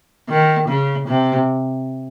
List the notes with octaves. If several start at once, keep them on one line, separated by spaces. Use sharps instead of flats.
D#3
C#3
C3